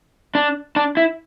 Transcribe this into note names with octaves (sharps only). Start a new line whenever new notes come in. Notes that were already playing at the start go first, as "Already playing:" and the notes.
D4
D4
E4